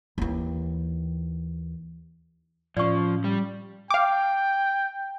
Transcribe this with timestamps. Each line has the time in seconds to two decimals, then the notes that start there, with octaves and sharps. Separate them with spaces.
0.18 D#2 E3
2.77 A2 F3 C#4 D5 C#6
3.24 G3
3.90 F5 G5 D6